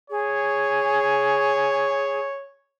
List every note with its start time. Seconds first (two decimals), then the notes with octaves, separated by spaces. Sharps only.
0.10 G#4 C#5